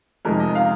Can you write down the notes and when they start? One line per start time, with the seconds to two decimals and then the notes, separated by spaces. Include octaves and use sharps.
0.25 F2 C3 D#3 G#3 A#4
0.40 D#5
0.55 F5